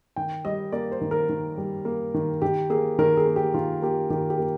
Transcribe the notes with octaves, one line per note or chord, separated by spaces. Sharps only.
D#3 G5
G3 D#5
A#3 D5
C5
D#3
A#4
D#3
G3
A#3
D#3
D#3 G4
A#3 G#4
D#3 A#4
G#4
A#3
G4
D#3 F4
A#3 G4
D#3 G4
G4
A#3